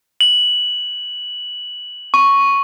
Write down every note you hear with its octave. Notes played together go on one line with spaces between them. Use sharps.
F#7
C#6